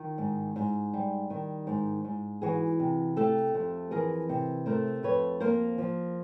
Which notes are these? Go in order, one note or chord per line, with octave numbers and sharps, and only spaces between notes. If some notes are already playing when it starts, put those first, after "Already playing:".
Already playing: D#3 F4
G#2
G#2
G3
D#3
G#2
G#2
E3 F#4 G#4
C3
A3 G4 A4
F2
E3 G#4 A#4
C3
A3 A#4 C5
F2 B4 C#5
A#3 A#4 C5
F3